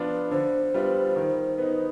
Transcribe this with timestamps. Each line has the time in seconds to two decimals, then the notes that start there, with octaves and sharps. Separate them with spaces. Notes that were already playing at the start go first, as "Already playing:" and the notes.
Already playing: F3 B3 D4 F4
0.31 D3 C5
0.74 G3 B3 F4
1.16 D#3
1.58 B3 D#4